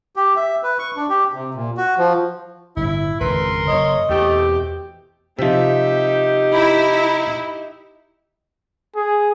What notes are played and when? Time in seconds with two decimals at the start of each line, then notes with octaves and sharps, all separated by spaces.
0.16 G4
0.36 E5
0.63 B4
0.79 C#6
0.97 D4
1.09 G4
1.33 C3
1.54 A#2
1.77 F#4
1.98 F3
2.77 G1 A2 E4
3.20 G#1 F2 C#3 A#4 B4 C6
3.68 F#1 C#5 D#5
4.09 E2 B2 A3 C4 G4
5.39 C3 F3 D#4 G4 E5
6.55 E4 A#5
8.96 G#4